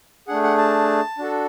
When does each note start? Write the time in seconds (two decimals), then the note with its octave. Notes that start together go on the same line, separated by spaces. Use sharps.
0.28 A3 D4 G#4 F#5
0.43 F#5
0.58 A5
1.18 D4 F#4 A4